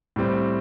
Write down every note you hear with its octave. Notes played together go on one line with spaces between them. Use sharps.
A2 G3 C4